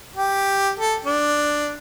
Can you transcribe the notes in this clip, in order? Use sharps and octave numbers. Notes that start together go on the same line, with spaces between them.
G4
A4
D4